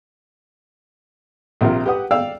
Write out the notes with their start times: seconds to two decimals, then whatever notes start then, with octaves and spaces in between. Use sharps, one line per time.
1.61 A#1 C3 F4 A#4
1.86 G4 B4 F#5 D#6
2.11 D5 F5 G5 E6